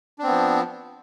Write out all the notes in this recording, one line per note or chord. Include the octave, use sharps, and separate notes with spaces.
F3 B3 C4 D4